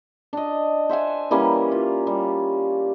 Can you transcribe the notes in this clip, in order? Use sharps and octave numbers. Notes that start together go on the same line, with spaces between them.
D4 D#5
C5 E5 F#5 G#5
E3 G3 A#3 C#4
F4
G3